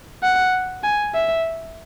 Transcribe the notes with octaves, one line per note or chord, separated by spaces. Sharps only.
F#5
G#5
E5